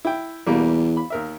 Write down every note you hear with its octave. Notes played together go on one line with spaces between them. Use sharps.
E4 G5
E2 B2 G3 A#3
B5
D#2 A#4 E5